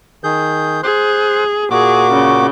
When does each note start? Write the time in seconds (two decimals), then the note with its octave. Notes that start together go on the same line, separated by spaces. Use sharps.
0.24 D#3 G#4 G6
0.83 G#4 C5 C6 F#6
1.70 A#2 F#4 G#4 D6
2.11 C#3